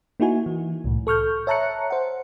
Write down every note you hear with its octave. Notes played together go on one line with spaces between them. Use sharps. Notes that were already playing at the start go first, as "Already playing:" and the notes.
A#3 D#4 E4 F#4 G#5
E3
C2 A2
A4 C#6 F6 G6
C#5 E5 A5 A#5 F#6 C#7
C5 F#5